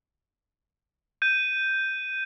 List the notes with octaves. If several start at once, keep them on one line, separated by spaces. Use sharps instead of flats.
G6 D#7